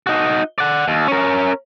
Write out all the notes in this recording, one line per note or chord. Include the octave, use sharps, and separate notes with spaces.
D#4 F#4
D5 F#5
D#2
C#4 A#4